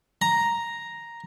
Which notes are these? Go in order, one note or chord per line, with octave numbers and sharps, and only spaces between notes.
A#5